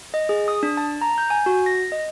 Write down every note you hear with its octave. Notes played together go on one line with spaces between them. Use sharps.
D#5
G#4
D#6
D4
A5
A#5
G6
G#5
F#4
A#6
D#5